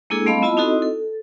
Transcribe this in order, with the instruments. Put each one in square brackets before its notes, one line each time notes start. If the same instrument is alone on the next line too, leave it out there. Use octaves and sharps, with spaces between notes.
[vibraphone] G#3 A#3 D4 E4 G#4 A4
G3 A3 C4 D#5 F5 B5
B3 E4 F4 D#5 A5 B5
C4 D#4 E4 F#4 A4 D#5
A4